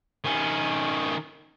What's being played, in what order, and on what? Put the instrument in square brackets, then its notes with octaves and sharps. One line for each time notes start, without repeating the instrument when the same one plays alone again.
[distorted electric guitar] D#3 C#4